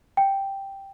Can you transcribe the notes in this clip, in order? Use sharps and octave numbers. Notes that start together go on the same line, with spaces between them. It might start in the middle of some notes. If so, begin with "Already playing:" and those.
G5